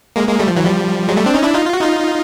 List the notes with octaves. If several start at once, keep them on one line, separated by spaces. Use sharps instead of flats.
G#3 A#3
G#3 A#3
G3 A3
F3
E3 F#3
F3 G3
F#3 G#3
G3 A3
C4 D4
C#4 D#4
D4 E4
D#4 F4
F4
F#4
D#4 F4